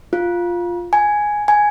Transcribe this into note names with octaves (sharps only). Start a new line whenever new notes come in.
F4
G#5
G#5